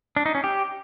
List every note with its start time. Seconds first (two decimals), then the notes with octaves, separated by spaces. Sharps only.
0.16 D4
0.26 D#4
0.35 C#4
0.44 G4